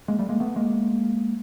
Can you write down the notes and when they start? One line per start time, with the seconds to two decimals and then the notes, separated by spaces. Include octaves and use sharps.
0.08 G#3 A#3
0.19 G3 A3
0.29 G#3 A#3
0.40 A3 B3
0.56 G#3 A#3